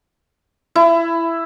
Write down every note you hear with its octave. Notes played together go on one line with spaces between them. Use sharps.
E4